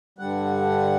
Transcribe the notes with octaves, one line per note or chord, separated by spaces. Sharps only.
G2 D3 G3 F#5